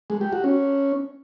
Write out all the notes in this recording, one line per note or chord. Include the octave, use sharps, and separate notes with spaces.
G#3
G4
F#4
C#4